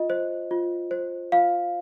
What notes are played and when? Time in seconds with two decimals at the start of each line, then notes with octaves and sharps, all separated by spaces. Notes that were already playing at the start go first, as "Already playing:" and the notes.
Already playing: F4 D#5
0.10 C5
0.51 F4
0.91 C5
1.32 F4 F5